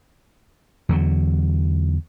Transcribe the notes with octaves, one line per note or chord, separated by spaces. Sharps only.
E2 D3 F#3